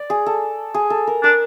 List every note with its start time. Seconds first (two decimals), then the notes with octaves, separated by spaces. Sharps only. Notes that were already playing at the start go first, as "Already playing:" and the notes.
Already playing: D5
0.10 G#4
0.26 A4
0.74 G#4
0.90 A4
1.07 A#4
1.23 D4 A#4